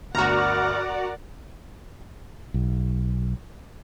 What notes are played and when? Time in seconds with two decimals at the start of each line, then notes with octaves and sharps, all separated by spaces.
0.15 G1 D2 F#4 A#4 D5 F#5 A#5 F6
2.54 B1